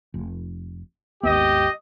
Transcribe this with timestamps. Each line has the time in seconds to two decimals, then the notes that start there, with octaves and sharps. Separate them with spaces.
0.14 F1
1.23 G#1 D#2 B3 G4 D#5